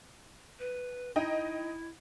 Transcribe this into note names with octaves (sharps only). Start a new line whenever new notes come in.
B4
D#4 E4 D#5 G5